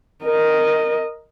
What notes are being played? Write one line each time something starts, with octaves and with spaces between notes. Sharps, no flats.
A#4 D#5